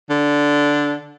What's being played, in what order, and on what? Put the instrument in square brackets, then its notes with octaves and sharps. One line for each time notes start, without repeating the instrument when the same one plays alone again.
[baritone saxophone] D3